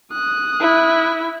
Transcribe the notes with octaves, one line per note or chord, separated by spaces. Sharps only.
D#6 F#6
E4